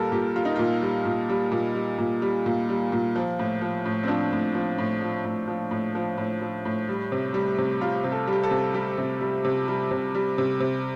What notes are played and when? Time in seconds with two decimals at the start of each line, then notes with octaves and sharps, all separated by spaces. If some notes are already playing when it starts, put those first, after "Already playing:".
Already playing: A#2 G3 A4 A#4
0.12 A#2 G4
0.36 G3 F4
0.45 D#4
0.56 A#2 F4
0.82 G3
1.05 A#2
1.29 G3
1.52 A#2
1.75 G3
1.98 A#2
2.22 G3
2.46 A#2
2.69 G3
2.92 A#2
3.16 F3
3.39 A2
3.61 F3
3.85 A2
4.04 C4
4.08 F3 D4
4.32 A2
4.55 F3
4.78 A2
5.02 F3
5.25 A2
5.48 F3
5.71 A2
5.95 F3
6.18 A2
6.41 F3
6.65 A2
6.89 G3
7.12 C3
7.34 G3
7.58 C3
7.81 G3 F4
8.04 C3
8.12 A4
8.27 G3
8.33 G4
8.43 A4
8.51 C3
8.74 G3 G4
8.98 C3
9.21 G3
9.45 C3
9.68 G3
9.91 C3
10.15 G3
10.38 C3
10.60 C3